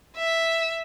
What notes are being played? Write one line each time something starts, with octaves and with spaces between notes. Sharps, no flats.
E5